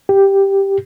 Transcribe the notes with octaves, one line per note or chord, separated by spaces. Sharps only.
G4